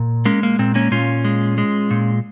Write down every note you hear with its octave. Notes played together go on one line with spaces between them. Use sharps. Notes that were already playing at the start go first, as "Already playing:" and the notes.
Already playing: A#2
G#3 A#3 C#4
A#3
A#2 C4
A#3 C#4
A#2 C#4 F4
G#3
G#3
A#2